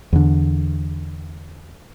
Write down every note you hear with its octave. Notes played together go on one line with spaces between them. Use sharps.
E2 D3